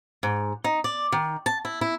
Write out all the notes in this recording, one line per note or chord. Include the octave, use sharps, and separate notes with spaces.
G#2
D#4
D5
D#3
A5
E4
E4